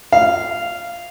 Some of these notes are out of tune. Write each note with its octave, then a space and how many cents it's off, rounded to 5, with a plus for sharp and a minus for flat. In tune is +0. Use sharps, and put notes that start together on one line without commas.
F5 -10